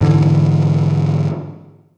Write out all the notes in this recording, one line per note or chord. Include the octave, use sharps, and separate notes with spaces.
G#2 D3 E3